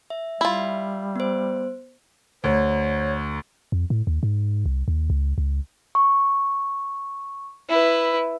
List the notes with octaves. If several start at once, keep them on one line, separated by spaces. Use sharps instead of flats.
E5
G3 E4 F4
B3 C5
D2 C#5
F2
A2
D#2
G#2
C2
D#2
C#2
C#2
C#6
E4 B4